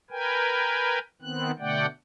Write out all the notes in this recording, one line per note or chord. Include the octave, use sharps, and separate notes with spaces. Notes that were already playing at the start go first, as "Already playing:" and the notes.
A#4 B4 G5 G#5
D#3 B3 C4 F#6
B2 D3 A3 D5 F#5 G5